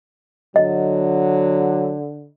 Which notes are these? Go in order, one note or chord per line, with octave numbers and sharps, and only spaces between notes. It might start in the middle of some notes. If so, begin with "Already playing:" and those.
D3 F#3 D#5